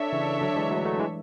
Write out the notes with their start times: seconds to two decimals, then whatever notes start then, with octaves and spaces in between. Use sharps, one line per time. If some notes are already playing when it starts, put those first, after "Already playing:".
Already playing: D4 A4 C#5 E5
0.13 C#3 E3
0.42 D3 F#3
0.56 E3 G#3
0.71 F#3 A3
0.85 F#3 A3
0.99 E3 G#3